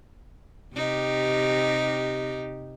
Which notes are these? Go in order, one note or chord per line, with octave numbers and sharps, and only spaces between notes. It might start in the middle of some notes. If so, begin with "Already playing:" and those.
C3 D#4 G4